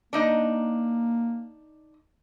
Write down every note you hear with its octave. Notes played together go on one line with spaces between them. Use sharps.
A#3 D4 D#4 D#5